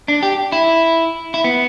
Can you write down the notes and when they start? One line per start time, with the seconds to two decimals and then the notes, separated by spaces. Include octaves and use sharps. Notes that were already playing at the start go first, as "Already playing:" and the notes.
0.08 D4
0.23 G4
0.52 E4
1.34 E4
1.44 B3